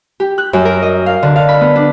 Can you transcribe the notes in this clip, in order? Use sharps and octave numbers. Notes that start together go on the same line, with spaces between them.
G4
F#6
F#2
A#4
D#5
F5
D3
F5
B5
B3
D4